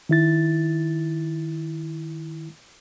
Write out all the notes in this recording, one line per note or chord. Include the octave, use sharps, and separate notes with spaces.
D#3 E4 A6